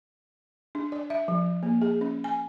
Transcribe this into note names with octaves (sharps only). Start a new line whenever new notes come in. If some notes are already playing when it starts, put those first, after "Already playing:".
D4
D5
E5
F3
A#3
G#4
C#4
G#5